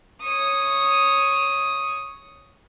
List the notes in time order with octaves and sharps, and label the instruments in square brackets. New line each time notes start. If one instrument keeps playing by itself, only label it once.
[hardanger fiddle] C#5 D#6